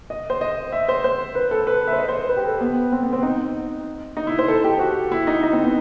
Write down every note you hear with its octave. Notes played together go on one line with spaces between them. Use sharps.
D#5
C5
D#5
E5
C5
C5
B4
A4
B4
E5
C5
D#5
C5
B4
B4
G4
A4
B3
C4
B3
C4
D#4
D#4
E4
C5
A4
G4
F#4
E4
D#4
D#4
C4
B3